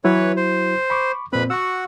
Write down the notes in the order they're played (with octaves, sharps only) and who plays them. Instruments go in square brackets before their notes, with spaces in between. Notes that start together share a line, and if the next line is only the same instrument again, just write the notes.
[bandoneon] E3 B4 C#5 [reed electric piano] F#3 E4 F#4
[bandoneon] C5
[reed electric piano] B5 C#6 D6
[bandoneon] F2 B4 B5 [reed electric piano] A#2 C4
[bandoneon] F#4 F#5 [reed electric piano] C#6 E6